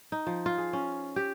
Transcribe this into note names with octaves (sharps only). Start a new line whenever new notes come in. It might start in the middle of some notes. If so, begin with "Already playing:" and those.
D#4
F3
F4
G#4
C#4
G4